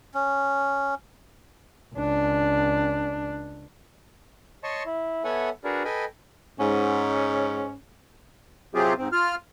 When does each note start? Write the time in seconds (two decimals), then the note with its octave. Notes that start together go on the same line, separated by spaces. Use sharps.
0.14 C#4
1.95 C#2 D4
4.64 C#5 D#5 A5 C6 C#6
4.86 E4
5.24 B3 A4 C#5 E5 F#5 G#5
5.64 D4 F#4 G#4 A#4 B4 D5
5.85 A4 B4 D#5 G5 G#5 B5
6.59 G#2 C#4
8.75 C3 F#3 C4 F4 G4 G#4
8.98 G#2 C4
9.12 F4 F6